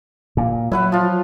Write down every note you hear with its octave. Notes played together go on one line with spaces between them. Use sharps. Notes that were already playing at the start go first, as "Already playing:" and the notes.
A#2
F#3 E4 B4 F#5
F3 F4